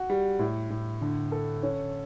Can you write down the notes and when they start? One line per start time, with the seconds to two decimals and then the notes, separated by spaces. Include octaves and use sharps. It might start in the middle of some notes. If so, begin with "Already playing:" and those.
Already playing: F#4
0.10 G3
0.39 A2
0.70 A2
1.01 D3
1.32 A4
1.63 C#4